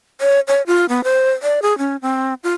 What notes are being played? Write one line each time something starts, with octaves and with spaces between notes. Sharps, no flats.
C#5
C#5
F4
B3
C5
D5
G#4
C#4
C4
F4